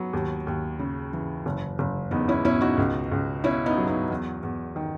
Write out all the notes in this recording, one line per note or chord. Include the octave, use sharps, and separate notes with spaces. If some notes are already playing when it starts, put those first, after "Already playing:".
Already playing: F#3 B3
D#2
D#2
C#3
E3
F#1
F#1
E2 B3 D#4
C#4 E4
B2 C#4 E4
D#4 F#4
C#2
C#2
B2 C#4 E4
B3 D#4
F#3
B3 D#4
E2
E2
D#3